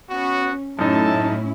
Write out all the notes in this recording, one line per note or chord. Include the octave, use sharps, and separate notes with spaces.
B3 C#4 F#4
F#2 A2 C#4 D#4 E4 A4 A5